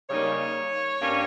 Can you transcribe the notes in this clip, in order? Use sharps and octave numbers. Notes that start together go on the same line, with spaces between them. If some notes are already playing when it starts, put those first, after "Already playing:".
C#3 G3 A#3 D#4 C#5
G2 G3 A#3 C#4